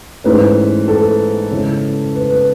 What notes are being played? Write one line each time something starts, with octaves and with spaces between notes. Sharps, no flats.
G#2 E3 A3 C#4 E4 B4
A4
C#3 G#3 C#4 E4
B4
B4